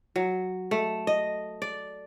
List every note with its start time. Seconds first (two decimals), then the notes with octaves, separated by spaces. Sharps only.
0.16 F#3
0.71 A3
1.07 D#5
1.62 D5